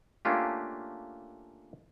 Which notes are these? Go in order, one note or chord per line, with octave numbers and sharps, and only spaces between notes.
A3 A#3 C#4 D4 F4 G4